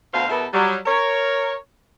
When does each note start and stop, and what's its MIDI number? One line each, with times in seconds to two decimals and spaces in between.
0.13 0.29 38
0.13 0.29 47
0.13 0.29 72
0.13 0.29 77
0.29 0.45 40
0.29 0.45 47
0.29 0.45 59
0.29 0.45 69
0.29 0.45 70
0.29 0.45 76
0.52 0.75 54
0.52 0.75 55
0.86 1.53 70
0.86 1.53 73